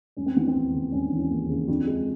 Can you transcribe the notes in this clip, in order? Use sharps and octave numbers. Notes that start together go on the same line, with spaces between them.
E1 C#4
C4
E3 B3
C4
D#2
C#3
E1 C#4
D4
E3
C#4
D#2
C#3
F2 D4
G#3